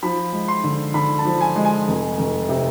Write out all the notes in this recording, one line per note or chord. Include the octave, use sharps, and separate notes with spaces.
F3 B5
G#3
C6
D3
D3 B5
A5
F3
G#5
G#3
G#5
F1
F1
C3